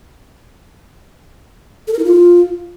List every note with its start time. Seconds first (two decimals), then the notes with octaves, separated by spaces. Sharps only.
1.88 A4
1.93 A#4
1.99 E4
2.05 F4